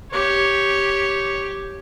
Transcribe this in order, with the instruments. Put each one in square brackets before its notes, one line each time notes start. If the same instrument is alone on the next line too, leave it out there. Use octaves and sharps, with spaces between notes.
[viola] G4 [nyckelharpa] C#5